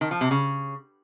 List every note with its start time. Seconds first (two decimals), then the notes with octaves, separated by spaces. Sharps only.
0.01 D#3
0.11 F3
0.21 C3
0.31 C#3